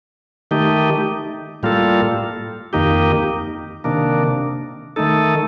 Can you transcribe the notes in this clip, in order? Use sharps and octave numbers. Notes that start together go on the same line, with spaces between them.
D#3 A3 D#4 G4
A2 G3 A#3 F4 A4
F2 D#3 A#3 D#4 G4
C3 D#3 A#3 D4
D#3 A3 D#4 A4